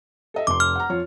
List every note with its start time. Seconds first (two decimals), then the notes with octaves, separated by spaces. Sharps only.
0.34 A4 D#5 E5
0.47 F1 C6 D6
0.60 F6
0.75 F#5 A#5
0.90 F2 F4 C#5